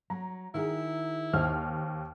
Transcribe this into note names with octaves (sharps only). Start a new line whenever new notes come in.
F#3 A#5
D#3 E4 F#4 G#4
D#2 C5 F6